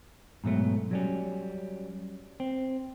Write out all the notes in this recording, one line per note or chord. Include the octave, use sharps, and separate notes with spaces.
G#2 B2 F#3 A3
F#3 G3 C#4
C4